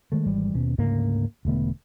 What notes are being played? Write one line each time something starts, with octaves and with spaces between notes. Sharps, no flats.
D#3 G#3 A3
G#1 E3 G3 G#3
D#2 B2 C#4
D2 G#2 C#3 A#3
E1 D3 A3 B3